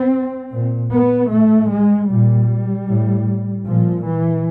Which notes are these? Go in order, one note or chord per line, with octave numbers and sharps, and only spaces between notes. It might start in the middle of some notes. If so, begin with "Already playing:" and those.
Already playing: C4
A#2
B3
A2 A3
G#3
A#2 G3
A2
A#2 F3
E3